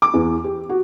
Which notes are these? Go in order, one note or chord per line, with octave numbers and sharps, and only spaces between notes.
D6
E2
G4
F#4